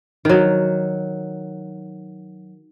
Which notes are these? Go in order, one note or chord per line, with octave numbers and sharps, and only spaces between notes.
D#3 F#3